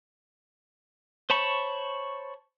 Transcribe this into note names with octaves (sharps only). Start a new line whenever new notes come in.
C5 C#5 A5 B5 C#6